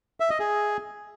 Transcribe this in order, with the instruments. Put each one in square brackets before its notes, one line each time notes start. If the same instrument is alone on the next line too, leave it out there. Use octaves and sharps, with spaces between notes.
[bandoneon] E5
D#5
G#4